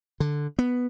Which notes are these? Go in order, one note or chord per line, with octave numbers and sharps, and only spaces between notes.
D3
B3